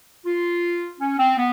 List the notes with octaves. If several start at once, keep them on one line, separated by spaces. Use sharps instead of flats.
F4
C#4
C4
B3